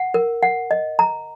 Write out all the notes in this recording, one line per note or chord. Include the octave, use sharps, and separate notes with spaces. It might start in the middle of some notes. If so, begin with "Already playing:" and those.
Already playing: F#5
A#4
F#5
D#5
A#5